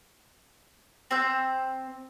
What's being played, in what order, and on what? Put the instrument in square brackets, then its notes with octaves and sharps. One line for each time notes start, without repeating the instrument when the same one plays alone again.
[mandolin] C4 C5 E6 G6